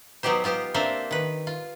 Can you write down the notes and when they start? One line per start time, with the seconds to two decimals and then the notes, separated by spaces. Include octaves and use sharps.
0.23 F#3 B3 D#4 G4 C5
0.44 B3 F4 G4 C5
0.74 A#3 C4 D4 C5 E5
1.11 D#3 B4
1.47 F4